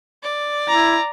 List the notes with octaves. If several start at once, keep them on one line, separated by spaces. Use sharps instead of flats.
D5
E4 A#5